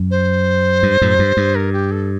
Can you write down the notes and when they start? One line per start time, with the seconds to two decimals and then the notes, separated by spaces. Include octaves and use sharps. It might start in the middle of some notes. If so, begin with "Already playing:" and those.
Already playing: F#2
0.11 C5
0.83 G2
1.02 F#2 A2
1.19 G2
1.37 G2
1.55 A#4
1.73 G4
1.91 A4